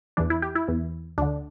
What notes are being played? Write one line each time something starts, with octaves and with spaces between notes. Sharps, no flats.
E2 E3 D4
E4
G4
E4
E2 E3
D2 D3 D4